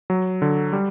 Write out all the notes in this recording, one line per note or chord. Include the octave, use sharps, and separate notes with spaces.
F#3
D3
G3